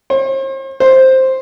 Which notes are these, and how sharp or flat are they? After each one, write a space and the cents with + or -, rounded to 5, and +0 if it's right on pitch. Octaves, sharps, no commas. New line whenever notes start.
C5 +45
C5 +5